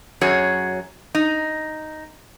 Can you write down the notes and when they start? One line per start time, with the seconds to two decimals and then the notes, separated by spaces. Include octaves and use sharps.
0.21 F#2 F#4 G#4 C#5
1.15 D#4